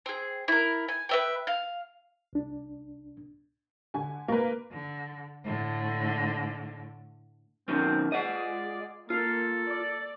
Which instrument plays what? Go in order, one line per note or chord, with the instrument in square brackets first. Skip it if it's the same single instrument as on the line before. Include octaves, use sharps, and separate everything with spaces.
[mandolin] C4 G#4
E4 A#4
G#5
B4 E5 G5
F5
[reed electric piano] C2 D4
[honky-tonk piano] D3 G#5
A#3 B4
[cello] D3
A2 D3
[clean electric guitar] F#2 B2 D#3 [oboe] C4
[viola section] G#3 F4 G#4 [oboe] D5 [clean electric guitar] D#5 F#5
[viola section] A#3 [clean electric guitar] F4 [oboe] A4
[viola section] D5